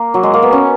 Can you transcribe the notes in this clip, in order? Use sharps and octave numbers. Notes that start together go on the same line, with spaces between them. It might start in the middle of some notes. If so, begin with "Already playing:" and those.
Already playing: A#3
F#3
G#3
A#3
B3
C#4